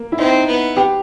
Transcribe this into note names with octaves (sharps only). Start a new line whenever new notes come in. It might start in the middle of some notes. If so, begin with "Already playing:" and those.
Already playing: A#3
E4
C4 D#4
B3
G4